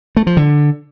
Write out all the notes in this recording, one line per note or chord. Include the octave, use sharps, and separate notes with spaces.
A3
F3
D3